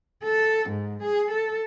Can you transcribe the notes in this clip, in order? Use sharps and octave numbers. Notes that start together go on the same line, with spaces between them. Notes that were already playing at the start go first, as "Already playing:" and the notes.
A4
G#2
G#4
A4